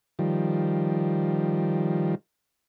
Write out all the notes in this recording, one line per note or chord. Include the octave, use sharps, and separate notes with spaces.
D#3 F3 G3